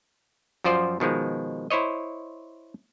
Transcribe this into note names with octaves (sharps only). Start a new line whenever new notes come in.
F#2 F3 F4 C5 D5
B2 D#3 F3 G#3
E4 C5 C#5 D#5